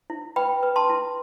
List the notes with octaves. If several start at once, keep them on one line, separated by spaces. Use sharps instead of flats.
E4
B4 G5 B5
B4
A5 C6
E4